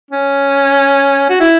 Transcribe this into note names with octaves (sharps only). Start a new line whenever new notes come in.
C#4
F#4
E4